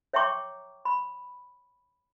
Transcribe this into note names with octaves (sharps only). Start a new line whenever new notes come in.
C#5 E5 G5 A#5 C#6 D6
B5